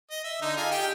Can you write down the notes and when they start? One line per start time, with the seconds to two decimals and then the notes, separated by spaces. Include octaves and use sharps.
0.11 D#5
0.24 E5
0.42 D3 D#4
0.57 F4 G#4 G#5
0.71 G4 G5